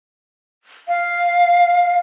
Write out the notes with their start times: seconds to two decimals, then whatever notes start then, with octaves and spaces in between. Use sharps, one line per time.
0.88 F5